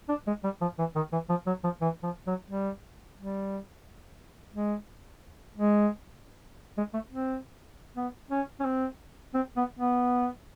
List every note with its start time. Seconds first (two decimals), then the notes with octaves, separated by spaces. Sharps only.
0.09 D4
0.27 G#3
0.44 G3
0.61 F3
0.79 E3
0.96 D#3
1.12 E3
1.29 F3
1.47 F#3
1.64 F3
1.81 E3
2.03 F3
2.27 F#3
2.49 G3
3.18 G3
4.54 G#3
5.57 G#3
6.78 G#3
6.93 A3
7.11 C4
7.97 B3
8.31 C#4
8.60 C#4
8.65 C4
9.34 C4
9.56 B3
9.79 B3